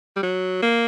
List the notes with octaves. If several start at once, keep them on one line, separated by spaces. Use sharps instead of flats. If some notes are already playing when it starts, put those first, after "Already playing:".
G3
F#3
A#3